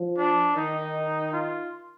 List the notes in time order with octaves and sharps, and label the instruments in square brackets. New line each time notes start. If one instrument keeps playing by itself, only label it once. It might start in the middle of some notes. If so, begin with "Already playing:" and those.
Already playing: [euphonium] F3
[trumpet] D4
[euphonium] D#3 [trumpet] D#4
[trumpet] F4